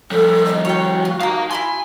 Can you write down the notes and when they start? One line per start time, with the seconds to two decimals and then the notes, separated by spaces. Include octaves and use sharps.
0.11 F3 G3 A4
0.45 D#5
0.65 F#4 C#5 G5
1.05 F4
1.21 D#4 F5 A5 A#5
1.51 E4 G#5 B5 C6